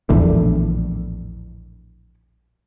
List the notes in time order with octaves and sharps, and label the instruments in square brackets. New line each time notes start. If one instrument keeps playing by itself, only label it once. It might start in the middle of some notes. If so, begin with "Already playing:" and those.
[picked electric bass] A#1 E2 A2 D3